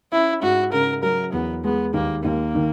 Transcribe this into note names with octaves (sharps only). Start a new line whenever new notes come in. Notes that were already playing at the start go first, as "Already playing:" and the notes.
C#4 E4
G#2 F#4
C#3 A#4
F#3 A#4
E2 B3
G#3 B3
D#2 A#3
D#2 A#3
D#3